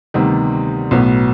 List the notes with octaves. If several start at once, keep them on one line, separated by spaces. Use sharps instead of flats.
D2 C3 D#3 G3 B3
B1 A2 F#3 B3